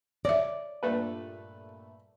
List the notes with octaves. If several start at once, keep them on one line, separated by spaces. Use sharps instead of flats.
C#5 D5 E5
G2 A#2 A3 B4